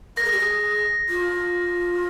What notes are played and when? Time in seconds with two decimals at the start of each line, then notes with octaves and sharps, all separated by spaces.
0.17 A#4 A#6
0.24 G#4
0.32 G4
0.39 G#4
1.09 F4